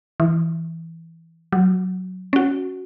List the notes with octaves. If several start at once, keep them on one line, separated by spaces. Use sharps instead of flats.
E3
F#3
C#4 F#4